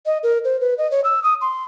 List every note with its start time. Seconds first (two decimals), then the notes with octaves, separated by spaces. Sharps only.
0.06 D#5
0.23 A#4
0.44 C5
0.61 B4
0.78 D#5
0.91 C#5
1.04 E6
1.23 D#6
1.41 C6